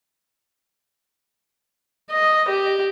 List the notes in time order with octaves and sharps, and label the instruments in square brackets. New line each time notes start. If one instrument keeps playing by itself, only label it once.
[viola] D#5
G4